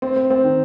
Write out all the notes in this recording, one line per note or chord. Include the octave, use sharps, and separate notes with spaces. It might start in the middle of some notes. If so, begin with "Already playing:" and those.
C4
C4
C4
D#3